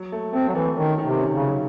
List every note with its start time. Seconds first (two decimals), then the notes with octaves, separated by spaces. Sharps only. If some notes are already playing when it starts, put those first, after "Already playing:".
Already playing: F#3
0.12 A3
0.33 A3 C4
0.49 F#3
0.54 E3 A3
0.76 D#3 C#4
0.98 D#3
1.05 C3
1.19 C#4
1.33 C#3
1.40 F#3